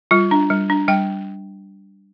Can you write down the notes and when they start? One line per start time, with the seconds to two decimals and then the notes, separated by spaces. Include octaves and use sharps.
0.11 G3 F4
0.31 D4
0.50 G3
0.70 D4
0.88 G3 G5